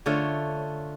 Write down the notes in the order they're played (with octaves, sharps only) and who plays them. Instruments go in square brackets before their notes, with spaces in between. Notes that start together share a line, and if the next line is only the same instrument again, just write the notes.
[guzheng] D3 A3 F4 C#5